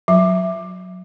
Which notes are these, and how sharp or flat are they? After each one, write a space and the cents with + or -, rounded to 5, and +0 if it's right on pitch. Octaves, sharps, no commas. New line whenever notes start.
F#3 -15 E5 +0